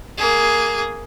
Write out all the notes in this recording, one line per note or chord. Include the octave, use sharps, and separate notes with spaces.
A#3 G#4